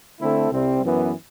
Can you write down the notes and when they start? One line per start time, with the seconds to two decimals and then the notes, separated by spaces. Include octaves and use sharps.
0.21 D3 A3 C4 E4 A4
0.50 C2 C3 G3 C4
0.81 F#2 E3 B3